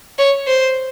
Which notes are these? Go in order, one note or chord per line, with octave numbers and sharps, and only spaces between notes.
C#5
C5